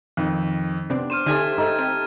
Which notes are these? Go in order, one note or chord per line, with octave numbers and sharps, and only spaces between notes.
F2 D#3
C3 B3 C4 D4
C5 D6 F6 D#7 E7
D3 A3 D#4 G4 G#5 A5 G#6 D#7
G#2 D#4 A4
C4